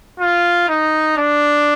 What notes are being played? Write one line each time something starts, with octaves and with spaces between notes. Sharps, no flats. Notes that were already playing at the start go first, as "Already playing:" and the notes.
F4
D#4
D4